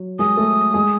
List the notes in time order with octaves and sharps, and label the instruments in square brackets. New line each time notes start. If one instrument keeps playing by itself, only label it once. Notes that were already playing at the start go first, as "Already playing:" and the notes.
Already playing: [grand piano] F#3
[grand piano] G#3 G#4 [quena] D#6
[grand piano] A3 A4
G#3 G#4